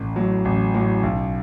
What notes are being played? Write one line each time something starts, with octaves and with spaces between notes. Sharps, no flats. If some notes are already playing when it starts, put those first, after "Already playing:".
Already playing: A1
A2 F#3
A1
A2 F#3
B1